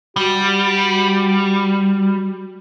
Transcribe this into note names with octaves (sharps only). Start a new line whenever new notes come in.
G3 F#4